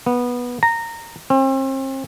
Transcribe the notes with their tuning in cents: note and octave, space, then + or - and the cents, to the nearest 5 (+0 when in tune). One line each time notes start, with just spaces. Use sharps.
B3 -15
A#5 -15
C4 +40